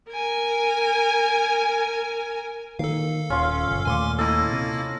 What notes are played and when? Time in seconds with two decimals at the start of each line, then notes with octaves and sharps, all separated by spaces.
0.10 A#4 G#5
2.79 D#3 A#3 A4 F5
3.30 D#1 C#4 F4
3.67 F#1
3.85 D#2 A#2 A3 G#5 C6 D6
4.19 A#3 E4 A4 D#5 A#5 A#6
4.52 C3